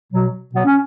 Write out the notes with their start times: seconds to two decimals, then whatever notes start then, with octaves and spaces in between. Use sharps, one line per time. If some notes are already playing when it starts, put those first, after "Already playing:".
0.12 B2 F#3
0.53 B2 F#3 B3
0.65 C#4